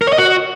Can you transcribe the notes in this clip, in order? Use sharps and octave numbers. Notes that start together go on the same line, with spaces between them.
A#4
C#5
D#5
F#4